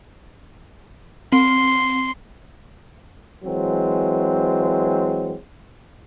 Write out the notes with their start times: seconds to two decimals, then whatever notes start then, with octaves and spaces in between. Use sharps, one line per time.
1.33 C4 C6
3.44 E3 F#3 G#3 C4